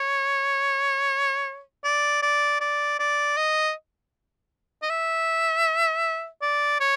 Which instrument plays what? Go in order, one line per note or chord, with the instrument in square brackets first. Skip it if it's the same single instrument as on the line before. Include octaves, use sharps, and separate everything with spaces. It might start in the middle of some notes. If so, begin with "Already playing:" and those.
Already playing: [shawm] C#5
D5
D5
D5
D5
D#5
D#5
E5
D5
C#5